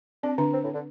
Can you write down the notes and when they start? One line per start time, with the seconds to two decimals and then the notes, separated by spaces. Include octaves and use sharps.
0.23 C4 D4
0.38 D3 D4
0.53 C4
0.64 A2
0.74 D3